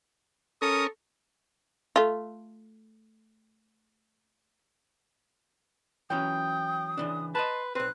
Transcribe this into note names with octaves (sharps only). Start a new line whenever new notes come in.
C#4 A4 A#4 D#6
A3 F4
E3 F#3 C#4 G5 D#6
C#3 E3 D4
B4 D#5 A5 C6
B1 C4 B4 F#6